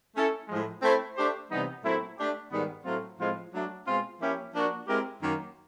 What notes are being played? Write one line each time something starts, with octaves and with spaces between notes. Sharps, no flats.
A3 C#4 E4 A4
A2 F3 G#3
A3 C4 E4
A3 D4 G4 C5
C3 E3 G3 B3 D#4
A#2 F#3 A3 C4 E4
A3 D4 G4
G#2 D#3 G3 B3
A2 F#3 A3 C4 F4
A2 F3 G#3 C4 F4
F#3 A3 D4
B2 G#3 C4 F4
F3 A#3 C#4 E4 G4
F3 A#3 D4 F#4
G#3 C4 E4 G4 A#4
F#2 D#3 F#3 A#3